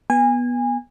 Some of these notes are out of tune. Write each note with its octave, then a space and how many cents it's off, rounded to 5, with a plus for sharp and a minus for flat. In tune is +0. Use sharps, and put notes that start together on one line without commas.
B3 -15 G#5 -25